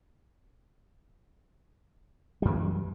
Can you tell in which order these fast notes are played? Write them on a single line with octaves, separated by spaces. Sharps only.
G3 F#2 E3